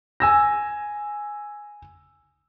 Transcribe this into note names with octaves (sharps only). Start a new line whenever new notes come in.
G#5 E6 A#6